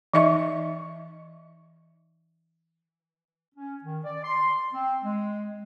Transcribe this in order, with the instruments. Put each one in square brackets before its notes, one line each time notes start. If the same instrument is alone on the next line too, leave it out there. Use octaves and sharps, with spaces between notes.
[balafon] E3 D#4 D#5 E5 C#6
[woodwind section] C#4
D#3
D5
C6
C4
G#3